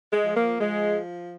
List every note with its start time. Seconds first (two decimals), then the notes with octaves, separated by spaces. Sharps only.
0.12 G#3
0.24 F3
0.36 A#3
0.60 F3 G#3